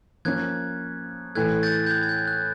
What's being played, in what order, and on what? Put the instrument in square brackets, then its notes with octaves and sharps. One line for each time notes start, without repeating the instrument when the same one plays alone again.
[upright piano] F3 A#3 C#4 [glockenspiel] F#6 G#6
[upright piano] A2 E3 A3 [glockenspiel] F#6 G#6
[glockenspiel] G6 A6
G6
F#6 G#6
G#6
G6
F#6